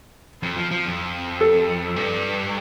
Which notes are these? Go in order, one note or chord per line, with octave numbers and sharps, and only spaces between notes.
F2
F3
F3
F2
A4
G2